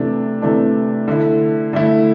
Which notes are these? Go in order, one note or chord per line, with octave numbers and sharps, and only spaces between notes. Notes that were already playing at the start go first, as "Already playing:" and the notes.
Already playing: C3 E3 A3 D4
C3 E3 A3 D4
D3 A3 E4
D3 A3 E4